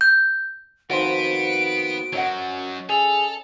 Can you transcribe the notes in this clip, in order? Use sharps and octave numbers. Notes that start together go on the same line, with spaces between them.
G6
F2 D#3 B3 F#4 C5 D7
F#2 F#3 C#4 D#5 F#5
G#4 A4 F7